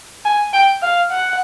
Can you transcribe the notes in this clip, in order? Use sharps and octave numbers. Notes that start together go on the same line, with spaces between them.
G#5
G5
F5
F#5